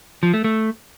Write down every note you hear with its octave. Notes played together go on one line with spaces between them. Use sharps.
F3
A3
A3